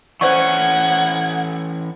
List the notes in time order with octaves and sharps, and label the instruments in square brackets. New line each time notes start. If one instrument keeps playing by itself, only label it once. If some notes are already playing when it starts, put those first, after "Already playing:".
[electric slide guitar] E3 C#4 [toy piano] C5 D5 C#6 [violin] F#5 G#6